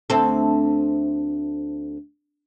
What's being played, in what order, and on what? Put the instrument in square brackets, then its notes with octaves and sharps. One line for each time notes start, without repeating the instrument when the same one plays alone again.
[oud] D2 C4 A4